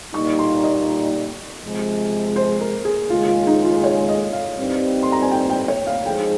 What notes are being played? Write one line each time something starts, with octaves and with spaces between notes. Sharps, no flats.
A#2 G3 A#3 D#4 C#6
C6
D#5
C3 F3 G#3
C5
A#4
G#4
D#2 C#3 G#3 F4
F4
D#4
F4
C#5
D#5
F5
G2 G3 C4 D#4
C6
A#5
G#5
G5
G5
C#5
F5
F3 G#3 D#4 G#4 G5